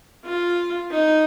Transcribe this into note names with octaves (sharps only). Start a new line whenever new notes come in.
F4
D#4